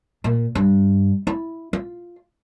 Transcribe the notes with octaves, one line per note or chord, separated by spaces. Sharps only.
A#2
G2
E4
F4